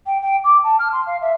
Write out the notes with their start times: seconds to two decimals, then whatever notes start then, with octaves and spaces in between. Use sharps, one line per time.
0.06 G5
0.22 G5
0.44 D6
0.63 A5
0.79 F6
0.93 C6
1.06 F5
1.21 E5